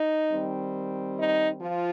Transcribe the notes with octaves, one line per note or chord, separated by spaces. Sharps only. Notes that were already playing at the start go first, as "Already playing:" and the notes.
Already playing: D#4
D#3 G3 C4
D#4
F3 F4